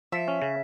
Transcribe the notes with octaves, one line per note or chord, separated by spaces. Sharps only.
F3 E5
C#4
C#3